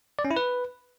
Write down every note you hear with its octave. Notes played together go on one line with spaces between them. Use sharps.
D5
C#4
E4
B4